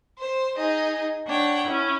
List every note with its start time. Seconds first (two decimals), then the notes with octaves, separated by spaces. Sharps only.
0.19 C5
0.56 D#4 G#4 D#5
1.26 D4 C#5 F#5 G5
1.65 C#4 E4